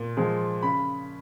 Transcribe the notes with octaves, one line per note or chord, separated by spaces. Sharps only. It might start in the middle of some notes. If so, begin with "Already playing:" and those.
Already playing: A#2
F3 G#3
C#3 B5